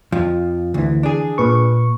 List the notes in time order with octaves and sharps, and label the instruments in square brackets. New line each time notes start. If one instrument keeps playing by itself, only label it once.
[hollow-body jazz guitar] F2 F3
[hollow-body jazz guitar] D2 [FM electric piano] D3 E3
[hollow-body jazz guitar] D4 G#4
[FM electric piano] A#2 B4 C#6